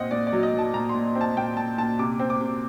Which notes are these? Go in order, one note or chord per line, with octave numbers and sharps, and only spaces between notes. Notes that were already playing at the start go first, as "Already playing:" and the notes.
Already playing: A#2 C4 D#5 F#5
A#2 D5
D5
F#3
D#5
F#3
A5
A#2 A#5
C6
A#2
C4
A5
A#2 G5
A#2 A5
A#2 A5
C3 D6
C4
D6
C3